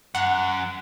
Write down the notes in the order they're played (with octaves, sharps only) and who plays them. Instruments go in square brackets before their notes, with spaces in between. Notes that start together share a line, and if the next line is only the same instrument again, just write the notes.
[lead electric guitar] F#2 [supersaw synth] F#5